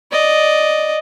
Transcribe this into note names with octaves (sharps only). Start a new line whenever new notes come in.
D5 D#5